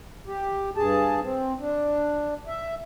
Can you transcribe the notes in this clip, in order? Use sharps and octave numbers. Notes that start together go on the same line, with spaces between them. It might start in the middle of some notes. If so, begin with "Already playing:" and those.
G4
G2 G#4 A5
C4
D4
E5